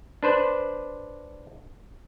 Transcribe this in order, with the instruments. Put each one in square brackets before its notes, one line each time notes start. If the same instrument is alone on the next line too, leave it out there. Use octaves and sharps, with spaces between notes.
[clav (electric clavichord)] D4 B4 C5 D5